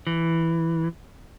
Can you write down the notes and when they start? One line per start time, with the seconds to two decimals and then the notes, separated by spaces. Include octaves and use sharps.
0.07 E3